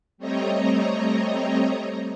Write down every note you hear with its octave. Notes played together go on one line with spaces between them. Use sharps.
G3 A3 C4 C#5 D#5 A#5